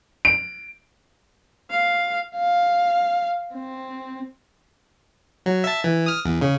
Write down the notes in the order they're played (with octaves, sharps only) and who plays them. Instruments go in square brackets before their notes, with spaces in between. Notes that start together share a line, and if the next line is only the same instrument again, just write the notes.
[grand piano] D7
[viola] F5
[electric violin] F5
C4
[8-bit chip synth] F#3
E5 A5
E3
D#6 F6
E2
C#3